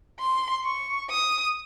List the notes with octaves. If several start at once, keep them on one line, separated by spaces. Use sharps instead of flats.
C6
C#6
D#6